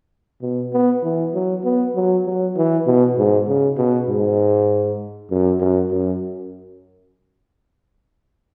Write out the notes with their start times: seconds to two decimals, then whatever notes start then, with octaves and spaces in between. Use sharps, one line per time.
0.42 B2
0.73 B3
1.04 E3
1.34 F#3
1.64 B3
1.95 F#3
2.26 F#3
2.57 E3
2.87 B2
3.18 G#2
3.48 C#3
3.78 B2
4.08 G#2
5.31 F#2
5.60 F#2
5.91 F#2